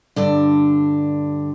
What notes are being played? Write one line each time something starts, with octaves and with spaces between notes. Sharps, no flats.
G2 D3 D4